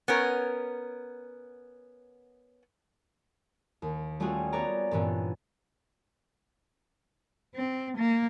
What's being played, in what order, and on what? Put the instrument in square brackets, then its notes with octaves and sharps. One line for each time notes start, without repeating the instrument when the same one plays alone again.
[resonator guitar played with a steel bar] B3 C#4 A#4
[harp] D#2
G3 A3 C#4 F4 F#4 G#4
B3 G#4 C#5 D5 A#5
G2 A#2 E3 B3 C#4 D4
[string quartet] C4
A#3